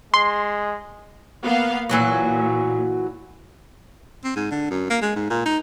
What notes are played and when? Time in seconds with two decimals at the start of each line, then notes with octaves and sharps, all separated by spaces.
0.14 G#3 C6
1.45 A#3 B3 F5
1.89 A#2 E3 F#3 F#4
4.24 C4
4.36 G#2
4.51 D3
4.70 F#2
4.90 A#3
5.02 G#3
5.16 G#2
5.30 A#2
5.46 D#4